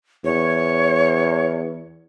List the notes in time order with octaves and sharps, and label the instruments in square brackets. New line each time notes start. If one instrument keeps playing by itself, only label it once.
[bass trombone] E2 [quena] C#5